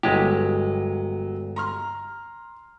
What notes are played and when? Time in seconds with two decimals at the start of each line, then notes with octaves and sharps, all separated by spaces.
0.03 G1 F#3 G#3 G4
1.56 A#5 C6 F6